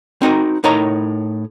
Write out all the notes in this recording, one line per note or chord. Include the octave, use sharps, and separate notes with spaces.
C4 D#4 F#4 A#4
A2 D#4 A#4 C#5 A#5